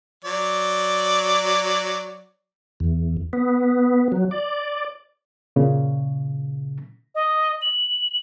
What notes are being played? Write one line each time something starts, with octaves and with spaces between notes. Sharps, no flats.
F#3 D5
E2
B3
F#3
D5
A#2 C#3
D#5
F#7